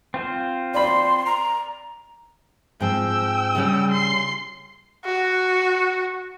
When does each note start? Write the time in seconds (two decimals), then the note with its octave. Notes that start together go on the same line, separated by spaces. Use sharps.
0.14 C4 F4 C5
0.74 D5 B5 C6
1.26 A#5
2.80 G#2 F3 C4 G5 E6
3.55 C#3 G3 C#4
3.91 C6 C7
5.05 F#4